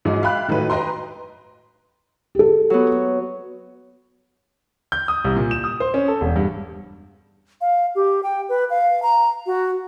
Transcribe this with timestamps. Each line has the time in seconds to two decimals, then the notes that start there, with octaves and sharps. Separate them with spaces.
0.05 G#2 F#3 G#3 D#4
0.22 E5 F5 G5 B5 F#6
0.48 A2 D#3 F#3 A3 B4
0.70 B4 D#5 G5 A#5 C6
2.35 G4 A4
2.70 F#3 B3
4.92 G6
5.08 D#6
5.24 C2
5.36 A#2
5.51 E7
5.64 D#6
5.80 C5
5.94 C#4
6.08 A4
6.21 E1
6.36 G2
7.61 F5
7.95 G4
8.23 G5
8.49 B4
8.70 F5
9.03 A#5
9.46 F#4